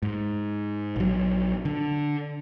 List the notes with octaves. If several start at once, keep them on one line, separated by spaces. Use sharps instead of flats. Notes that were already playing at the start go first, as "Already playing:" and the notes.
G#2
A#1 F#3
D3